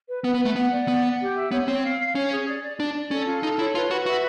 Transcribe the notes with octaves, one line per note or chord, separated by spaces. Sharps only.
B4
B3 B4
B3
B4
A3
B3 F#5
D5
B3 F#5
F#5
G4
E5
B3 C#5
C4 C#5
F5
F5
C#4 C#5
G#4
D5
D5
D4 D5
D5
C#4 A4
F4
D#4 A4
E4 C#5
F4 B4
F#4 B4
F#4 E5